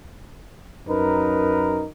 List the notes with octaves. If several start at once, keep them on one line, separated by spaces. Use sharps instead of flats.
F#2 D#4 A#4 B4